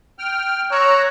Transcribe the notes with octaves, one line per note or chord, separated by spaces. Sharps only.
G5 F6
C#5 A#5 E6 F#6